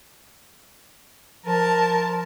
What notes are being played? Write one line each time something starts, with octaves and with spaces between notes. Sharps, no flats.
F3 A#4 A5